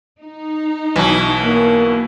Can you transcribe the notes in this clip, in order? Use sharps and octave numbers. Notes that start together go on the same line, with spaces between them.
D#4
B1 B2 E3
A#3